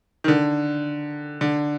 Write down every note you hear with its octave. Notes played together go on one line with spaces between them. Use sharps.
D#3
D3
D3